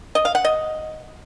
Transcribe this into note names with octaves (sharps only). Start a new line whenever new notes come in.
D#5
F5
F#5
D#5